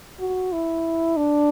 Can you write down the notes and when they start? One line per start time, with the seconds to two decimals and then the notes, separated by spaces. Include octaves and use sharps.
0.20 F#4
0.52 E4
1.16 D4